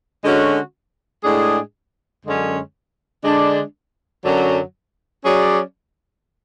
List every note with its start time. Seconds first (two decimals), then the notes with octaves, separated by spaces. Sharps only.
0.24 D3 G#3 C#4 F#4
1.24 A2 G#3 D4 G#4
2.24 F#2 D3 G#3 C#4
3.24 D3 G#3 D4
4.24 F#2 D3 F#3
5.24 F#3 C#4 G#4 D5